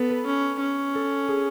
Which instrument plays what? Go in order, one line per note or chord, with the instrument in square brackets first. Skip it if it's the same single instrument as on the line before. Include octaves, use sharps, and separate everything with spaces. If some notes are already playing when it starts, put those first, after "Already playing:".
Already playing: [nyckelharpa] B3 [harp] A4
[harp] B4
[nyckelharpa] C#4
C#4
[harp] A4
G#4